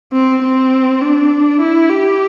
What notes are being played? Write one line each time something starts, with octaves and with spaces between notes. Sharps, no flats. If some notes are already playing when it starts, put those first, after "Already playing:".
C4
C4
D4
E4
G4